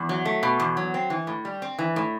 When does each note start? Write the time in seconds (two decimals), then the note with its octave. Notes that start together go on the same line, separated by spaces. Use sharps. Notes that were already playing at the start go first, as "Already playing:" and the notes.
Already playing: E2
0.09 F#3
0.25 A3
0.43 B2
0.60 E2
0.77 F#3
0.94 C4
1.10 E3
1.27 A2
1.45 G3
1.62 C4
1.79 E3
1.96 A2